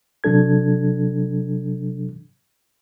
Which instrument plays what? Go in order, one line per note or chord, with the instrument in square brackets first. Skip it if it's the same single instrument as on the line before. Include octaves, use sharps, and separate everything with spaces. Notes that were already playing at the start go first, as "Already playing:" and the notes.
[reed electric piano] C3 F#3 D4 A4 G#6